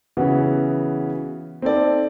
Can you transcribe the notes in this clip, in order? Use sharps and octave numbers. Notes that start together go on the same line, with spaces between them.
C#3 E3 B3 F#4
C4 D#4 A4 D5